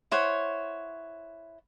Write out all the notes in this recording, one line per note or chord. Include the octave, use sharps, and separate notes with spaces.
E4 C5 C#5 F#5